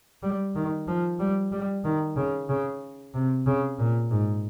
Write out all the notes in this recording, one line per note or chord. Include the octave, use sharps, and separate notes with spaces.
G3
D#3
F3
G3
G3
D#3
C#3
C#3
C3
C#3
A#2
G#2